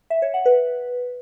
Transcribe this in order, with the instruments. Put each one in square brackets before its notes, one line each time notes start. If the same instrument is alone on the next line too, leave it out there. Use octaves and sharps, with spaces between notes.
[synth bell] E5
C#5
F#5
B4